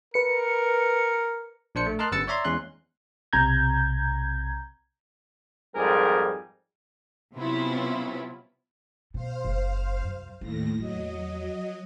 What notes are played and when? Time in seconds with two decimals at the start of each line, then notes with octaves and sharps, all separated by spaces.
0.14 A#4 B4 C#7
1.75 A#1 D4 C5 C#7
1.86 A3
1.99 A#4 D#5 A5 C6 F6 F#6
2.12 G1 F#2 B4 E6 A6 C#7
2.27 C#5 D5 E5 A#5 C6
2.44 E2 G#3 C#4 C6 F#6
3.33 B1 C3 A#5 G6 G#6
5.76 F2 G#2 G3 G#4 A#4
7.35 C3 F#3 B3 C#4 E4 F4
9.14 B2 C5 F5
9.44 F#1
10.02 C2 F#2
10.41 D#2 A2 A3 A#6
10.78 E2 F#3 D#5